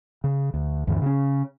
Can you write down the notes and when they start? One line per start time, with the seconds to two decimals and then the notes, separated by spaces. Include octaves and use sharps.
0.24 C#3
0.54 D2
0.87 D2 G2 E3
1.02 C#3 C#4